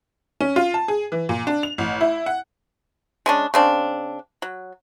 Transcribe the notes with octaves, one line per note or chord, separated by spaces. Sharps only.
C#4
F4
A5
G#4
E3
A#2
D4
F7
A1
E4
F#5
G#3 C#4 D4
C#3 C4 D4
F#3